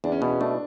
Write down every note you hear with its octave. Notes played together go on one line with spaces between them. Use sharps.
E2 D4
C#4
B2 B3
C#4
A3 D4